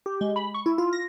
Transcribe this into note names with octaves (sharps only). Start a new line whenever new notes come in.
G4
G#3
B5
C#6
E4
F4
A#6